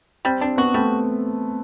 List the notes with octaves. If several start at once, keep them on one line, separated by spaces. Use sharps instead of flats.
G3 C4
C4 D4
B3 F#4
G3 A3